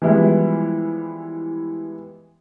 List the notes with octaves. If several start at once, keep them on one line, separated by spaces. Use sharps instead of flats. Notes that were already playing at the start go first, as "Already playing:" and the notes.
E3 F3 G3 G#3 B3 E4